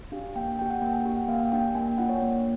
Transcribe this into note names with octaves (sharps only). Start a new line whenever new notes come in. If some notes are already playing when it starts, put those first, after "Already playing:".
D4 G4 F5
A#3 G5
G5
D4 G4 G5
F#5
A#3 G5
G#5
D4 G4 G5
F#5
A#3 F5
G5
D4 G4 G5
G5
A#3 G#5
G5
D4 F4 F#5
C#5
A#3